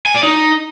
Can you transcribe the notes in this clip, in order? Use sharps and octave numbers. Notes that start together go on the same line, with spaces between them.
G#5
D5
D#4